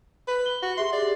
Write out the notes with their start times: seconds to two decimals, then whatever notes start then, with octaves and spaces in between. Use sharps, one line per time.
0.28 B4
0.46 G7
0.63 F#4
0.77 G4 G#4 E5 C6
0.93 D5